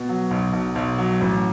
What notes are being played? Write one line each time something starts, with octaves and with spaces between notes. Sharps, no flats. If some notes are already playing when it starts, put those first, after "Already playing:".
Already playing: B2
F#3
B1
B1
B1
F#3
A1